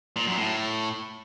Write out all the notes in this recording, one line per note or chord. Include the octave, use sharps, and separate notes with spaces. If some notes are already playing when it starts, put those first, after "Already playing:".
A#2
F#2
A2